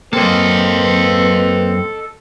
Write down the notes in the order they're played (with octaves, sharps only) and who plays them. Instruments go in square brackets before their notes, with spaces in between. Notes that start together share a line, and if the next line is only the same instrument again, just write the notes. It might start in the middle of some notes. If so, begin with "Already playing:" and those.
[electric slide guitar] F#2 A#3 [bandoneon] C4 [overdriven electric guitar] A4 D#5 [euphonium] B4